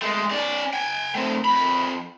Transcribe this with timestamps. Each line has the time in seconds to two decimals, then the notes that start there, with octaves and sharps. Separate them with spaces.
0.02 G#3 A3
0.31 C#4 D5
0.73 G5 G#5
1.15 A3 C4
1.45 F2 B5